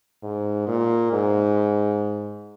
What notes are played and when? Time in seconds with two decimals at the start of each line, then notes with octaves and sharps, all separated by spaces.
0.23 G#2
0.68 A#2
1.13 G#2